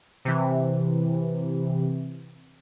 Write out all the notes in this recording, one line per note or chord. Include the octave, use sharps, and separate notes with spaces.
C3 E3